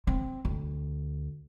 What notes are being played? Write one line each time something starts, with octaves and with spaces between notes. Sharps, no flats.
C4
D2